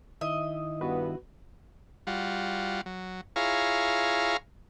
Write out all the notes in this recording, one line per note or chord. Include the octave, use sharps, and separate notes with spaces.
D#3 E4 D#5 E5
G2 B3 F#4 B4
G3 F4 F#4
F#3
E4 F4 G#4 C#5 F5 A#5